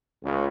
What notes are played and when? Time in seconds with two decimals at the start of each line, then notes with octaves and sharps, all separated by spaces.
0.23 C#2